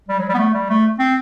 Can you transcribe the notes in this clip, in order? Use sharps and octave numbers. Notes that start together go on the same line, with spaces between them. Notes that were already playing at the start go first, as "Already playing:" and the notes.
G3
F#3
G3
B3
A3
G3
A3
C4